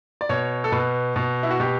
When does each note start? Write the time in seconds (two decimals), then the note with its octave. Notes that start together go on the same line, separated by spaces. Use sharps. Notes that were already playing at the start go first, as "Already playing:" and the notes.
0.21 D5
0.29 B2 C#5
0.64 A4
0.72 B2 B4
1.16 B2
1.43 E4
1.51 F#4
1.60 B2 G4